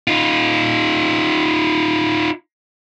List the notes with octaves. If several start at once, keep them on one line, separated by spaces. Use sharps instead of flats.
D#4 F4